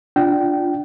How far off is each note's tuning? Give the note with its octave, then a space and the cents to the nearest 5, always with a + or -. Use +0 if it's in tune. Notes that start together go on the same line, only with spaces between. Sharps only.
D4 +0 F4 +0 G5 -25